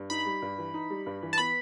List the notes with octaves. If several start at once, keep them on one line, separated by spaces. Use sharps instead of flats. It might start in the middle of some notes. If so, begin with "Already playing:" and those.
Already playing: G2
D#4 B5
G3
G2
E3
D#4
G3
G2
E3
A5
B3 B5